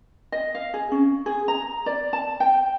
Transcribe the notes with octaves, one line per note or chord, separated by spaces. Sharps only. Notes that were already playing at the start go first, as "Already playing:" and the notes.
D#5
F5
G#4
C#4
G#4
A#5
D5
A5
G5